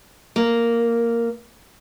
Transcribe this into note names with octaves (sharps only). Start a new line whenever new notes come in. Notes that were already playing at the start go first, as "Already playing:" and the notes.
A#3